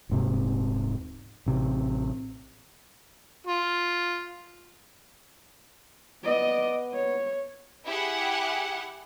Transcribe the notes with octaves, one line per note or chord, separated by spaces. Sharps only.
D#1 G#2 C3
A1 C3
F4
B3 D5 D#5
C#5
E4 G4 G#4 F#5